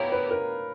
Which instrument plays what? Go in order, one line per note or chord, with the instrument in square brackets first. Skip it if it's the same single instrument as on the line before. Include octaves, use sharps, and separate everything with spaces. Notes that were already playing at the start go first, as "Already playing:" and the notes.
Already playing: [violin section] B3 E4 G4 A#4 [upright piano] C#5 F5
[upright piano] B4
A#4